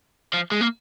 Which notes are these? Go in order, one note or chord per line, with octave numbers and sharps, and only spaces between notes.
F3
G#3
A#3